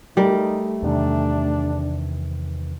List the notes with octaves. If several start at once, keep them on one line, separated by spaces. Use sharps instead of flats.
G3 A3 D#4 A#4
E2 C3 D#3 D4